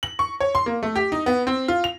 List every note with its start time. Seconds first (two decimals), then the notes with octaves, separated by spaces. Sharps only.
0.03 F#7
0.19 C#6
0.40 C#5
0.55 C6
0.66 A#3
0.83 A3
0.96 G4
1.12 D#4
1.26 B3
1.47 C4
1.68 F4
1.84 F7